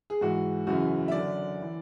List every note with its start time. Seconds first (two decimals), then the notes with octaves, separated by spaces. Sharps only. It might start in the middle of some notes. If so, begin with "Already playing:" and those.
0.10 G#4
0.21 G#2 E3 F#4
0.67 F#2 C#3 E3 F#4
1.08 E5
1.12 F#2 D3 D5
1.62 E3